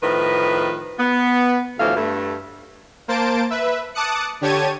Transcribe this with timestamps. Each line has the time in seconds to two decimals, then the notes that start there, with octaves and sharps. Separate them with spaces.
0.02 A2 D#3 F3 B4
0.99 B3
1.79 D2 A2 E3 F3 F5
1.96 G2 A3
3.08 A#3 C5 A5 D7
3.50 B4 E5
3.95 A5 D6 D#6 F#6 C#7
4.41 D3 G4 C#5 A5 G#6 D#7